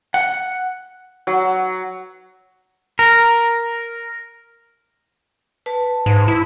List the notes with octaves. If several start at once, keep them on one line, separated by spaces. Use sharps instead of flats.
F#5
F#3
A#4
B4 A5
G#2
E4